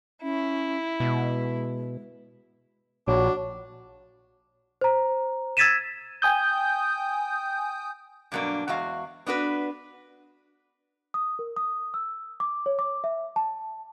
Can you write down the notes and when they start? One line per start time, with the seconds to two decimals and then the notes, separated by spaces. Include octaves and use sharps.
0.22 C#4 E4
1.00 B2 G#3
3.08 A#1 D4 F#4 C#5
4.81 C5 A#5
5.57 E6 G#6 A6 B6 D#7 E7
6.22 G5 G#5 D#6 G6
8.32 G2 B2 F#3 A#3 D4
8.68 E2 G#3 F#4 F5
9.26 B3 D4 F#4 B4
11.14 D#6
11.39 A#4
11.57 D#6
11.94 E6
12.40 D6
12.66 C#5
12.79 D6
13.04 E5
13.36 A5